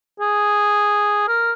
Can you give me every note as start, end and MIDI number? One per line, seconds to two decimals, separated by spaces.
0.20 1.25 68
1.28 1.52 70